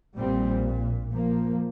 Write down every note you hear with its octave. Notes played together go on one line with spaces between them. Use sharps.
A#1 A#2 G3 C4
F3 A#3